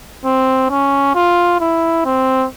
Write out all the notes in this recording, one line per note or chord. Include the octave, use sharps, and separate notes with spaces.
C4
C#4
F4
E4
C4